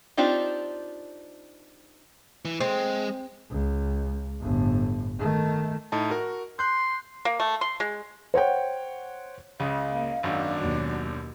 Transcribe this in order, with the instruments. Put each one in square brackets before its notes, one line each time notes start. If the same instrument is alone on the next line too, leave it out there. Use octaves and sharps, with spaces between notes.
[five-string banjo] C4 D4 D#4 F4 G4
[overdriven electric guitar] E3
[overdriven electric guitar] G#3 [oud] C4
[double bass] C#2
G1 A2
D#3 A3
[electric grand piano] A2 D#4 A5
F#4 A#4
[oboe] C6 [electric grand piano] F#6 G6
[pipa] A#3
A3
C6
G#3
[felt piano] C5 C#5 F#5 G5
[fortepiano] C#2 C#3 [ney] D#5 [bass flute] F5
[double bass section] A#3
[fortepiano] G#1 F#2 [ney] D4
[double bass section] D#2 B2 [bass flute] F#3